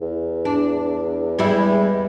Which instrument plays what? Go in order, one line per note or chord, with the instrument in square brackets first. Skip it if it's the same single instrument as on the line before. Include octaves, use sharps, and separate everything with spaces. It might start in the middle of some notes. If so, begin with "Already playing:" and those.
[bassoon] E2
[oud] D4
G3 G#3 E4